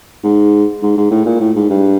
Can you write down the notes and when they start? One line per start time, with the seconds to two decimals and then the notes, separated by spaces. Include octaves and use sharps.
0.23 G#2
0.83 G#2
0.97 G#2
1.11 A2
1.26 A#2
1.40 A2
1.56 G#2
1.70 G2